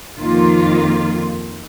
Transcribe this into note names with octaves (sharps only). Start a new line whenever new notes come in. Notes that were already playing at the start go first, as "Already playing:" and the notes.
F2 D#3 A#3 F4